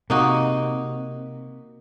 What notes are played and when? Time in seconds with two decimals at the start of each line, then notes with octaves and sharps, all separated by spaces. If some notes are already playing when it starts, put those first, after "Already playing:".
0.10 C3 A#3 D#4 F#4